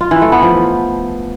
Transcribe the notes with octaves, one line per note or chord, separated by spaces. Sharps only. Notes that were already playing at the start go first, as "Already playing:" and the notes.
F4
E3
A3
B3
F3